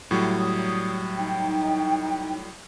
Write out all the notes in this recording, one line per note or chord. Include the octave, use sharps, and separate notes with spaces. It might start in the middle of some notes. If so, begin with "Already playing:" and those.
A2 F#3 G3
D#6
D#4 G5